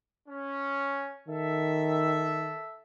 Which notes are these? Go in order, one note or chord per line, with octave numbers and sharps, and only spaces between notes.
C#4
D#3 A4 E5